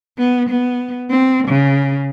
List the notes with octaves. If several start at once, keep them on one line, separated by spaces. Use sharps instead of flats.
B3
B3
C4
C#3